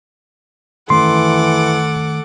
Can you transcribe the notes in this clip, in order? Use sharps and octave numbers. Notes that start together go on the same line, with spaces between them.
D#3 E3 A3 C#4 A4 F#5 C6 D6